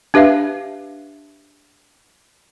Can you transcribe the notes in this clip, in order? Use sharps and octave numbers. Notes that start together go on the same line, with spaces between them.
D4 G4 B4 E5 F5